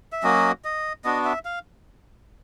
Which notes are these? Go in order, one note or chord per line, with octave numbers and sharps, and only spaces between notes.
E5
F#3 A#3 C#4 F#4 D#5
D#5
B3 D4 F#4 D#5
E5
F5